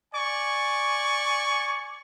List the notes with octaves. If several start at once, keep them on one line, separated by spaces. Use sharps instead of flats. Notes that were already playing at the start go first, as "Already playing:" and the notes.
D5 G#5 C#6